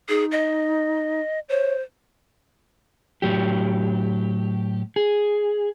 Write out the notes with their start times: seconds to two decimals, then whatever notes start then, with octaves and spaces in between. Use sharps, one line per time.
0.09 D#4 G#4
0.32 D#5
1.49 C5 C#5
3.22 A2 F#3 G4
4.96 G#4